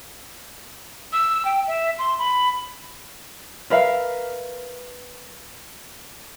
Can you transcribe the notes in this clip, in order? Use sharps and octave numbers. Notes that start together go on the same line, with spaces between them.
E6
G5
E5
C6
B5
A#4 B4 E5 F5